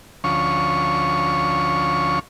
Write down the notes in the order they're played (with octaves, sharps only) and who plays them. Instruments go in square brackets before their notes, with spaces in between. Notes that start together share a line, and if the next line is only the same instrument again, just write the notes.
[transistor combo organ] D2 F3 C#4 C#6